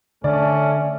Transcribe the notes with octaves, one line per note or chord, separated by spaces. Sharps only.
D3 A3 C#4 D5